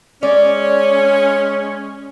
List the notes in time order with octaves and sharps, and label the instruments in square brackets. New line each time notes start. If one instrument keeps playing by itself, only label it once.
[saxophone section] G#3 C#4 [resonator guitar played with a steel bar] D5